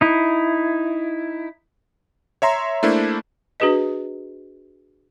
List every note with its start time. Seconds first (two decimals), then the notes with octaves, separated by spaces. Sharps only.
0.01 D#4 E4
2.42 C#5 E5 A#5 C6
2.83 A3 A#3 D4 E4 C5
3.60 D4 F#4 G#4 B4 D#5